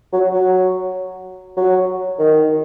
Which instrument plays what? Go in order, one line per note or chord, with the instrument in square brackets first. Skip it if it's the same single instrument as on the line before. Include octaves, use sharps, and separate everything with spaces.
[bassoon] F#3
F#3
F#3
D#3